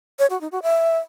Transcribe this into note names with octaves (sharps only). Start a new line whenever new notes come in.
C#5
F#4
D#4
F#4
E5